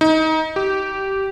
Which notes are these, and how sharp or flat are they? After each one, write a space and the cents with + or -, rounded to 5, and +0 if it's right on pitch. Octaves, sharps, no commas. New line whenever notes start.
D#4 +25
G4 -15